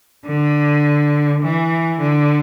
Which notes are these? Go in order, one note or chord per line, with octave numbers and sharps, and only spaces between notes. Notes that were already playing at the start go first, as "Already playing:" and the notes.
D3
E3
D3